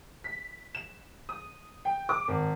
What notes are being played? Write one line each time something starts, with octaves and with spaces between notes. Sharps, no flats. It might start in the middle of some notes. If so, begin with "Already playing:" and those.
B6
E7
D#6
G5
D6
G#1